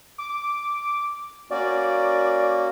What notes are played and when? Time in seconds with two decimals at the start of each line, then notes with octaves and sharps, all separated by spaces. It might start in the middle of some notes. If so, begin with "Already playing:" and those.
0.18 D6
1.51 A#3 C#4 F#4 D5